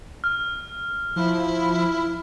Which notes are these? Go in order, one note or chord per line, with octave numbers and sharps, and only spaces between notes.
F6
F3 E4